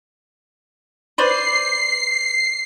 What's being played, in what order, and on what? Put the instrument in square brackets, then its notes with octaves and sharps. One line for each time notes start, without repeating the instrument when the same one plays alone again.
[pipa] B4 C5 D5 [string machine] C7